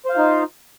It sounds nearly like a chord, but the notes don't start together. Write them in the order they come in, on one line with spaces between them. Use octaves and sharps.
C5 F5 F4 D#4